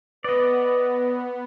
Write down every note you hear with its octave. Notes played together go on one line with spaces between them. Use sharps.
B3 B4 D5 D#5